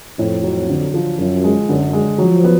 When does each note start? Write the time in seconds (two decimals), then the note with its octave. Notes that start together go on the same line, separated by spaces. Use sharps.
0.19 F2 A2
0.44 F#3
0.69 D3
0.94 F3
1.18 F#2 F3
1.44 G#3
1.68 F#2 D3
1.93 G#3
2.18 F3 F#3
2.44 B3